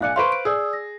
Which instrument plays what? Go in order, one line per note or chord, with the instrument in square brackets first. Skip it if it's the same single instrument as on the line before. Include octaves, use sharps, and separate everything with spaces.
[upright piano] B1 D5 G#5 [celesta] F5 F#6 C#7
[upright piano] B4 C5 F5 [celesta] C6 C#6 D7
[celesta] D7
[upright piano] G#4 [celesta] D5 D#6 E6
[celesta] A#6